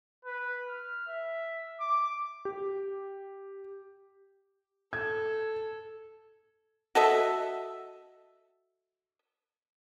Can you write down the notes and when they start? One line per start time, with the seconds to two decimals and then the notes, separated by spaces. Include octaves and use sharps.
0.25 B4
0.67 F6
1.08 E5
1.80 D6
2.45 G4
4.93 A4 G#6
6.95 F#4 A4 D#5 E5